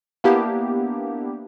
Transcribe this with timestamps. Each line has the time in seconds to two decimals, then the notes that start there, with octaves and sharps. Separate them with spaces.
0.24 A#3 B3 D4 E4 G4